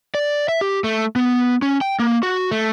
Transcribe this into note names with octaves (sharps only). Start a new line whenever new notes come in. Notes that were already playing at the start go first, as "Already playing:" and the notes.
D5
E5
G4
A3
B3
C#4
G5
A#3
F#4
A3